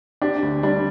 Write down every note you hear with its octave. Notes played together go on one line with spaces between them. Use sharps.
C4 D4 G4
D2
G3 D4